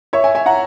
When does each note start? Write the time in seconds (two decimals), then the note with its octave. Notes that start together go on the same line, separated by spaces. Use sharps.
0.13 C#5 E5
0.24 E5 G#5
0.35 E5 G#5
0.46 F#5 A#5